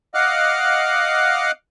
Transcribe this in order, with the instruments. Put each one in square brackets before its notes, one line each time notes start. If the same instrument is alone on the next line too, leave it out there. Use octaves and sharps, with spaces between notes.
[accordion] D#5 F5 F#5 D6 F6 F#6